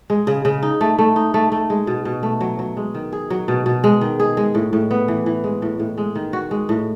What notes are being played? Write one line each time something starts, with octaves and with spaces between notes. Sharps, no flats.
G#3
C#3
C#3
D#4
A3
A3
D#4
A3
A3
G#3
B2
B2
A3
F#3
F#3
G#3
D#3
G#4
F#3
B2
B2
G#3
D#3
G#4
G#3
A2
A2
B3
E3
E3
G#3
A2
A2
G#3
D#3
F#4
G#3
A2